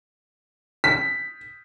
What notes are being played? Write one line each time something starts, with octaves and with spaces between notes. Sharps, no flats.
B6